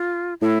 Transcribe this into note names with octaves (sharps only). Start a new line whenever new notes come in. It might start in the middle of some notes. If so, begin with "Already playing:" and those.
Already playing: F4
A2 E4